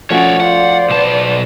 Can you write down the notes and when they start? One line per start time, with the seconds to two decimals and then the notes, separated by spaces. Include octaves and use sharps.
0.10 F3 A3 C#4 F#4 C#5 D5
0.40 F4 C5 D5 F#5
0.90 B1 B3 A5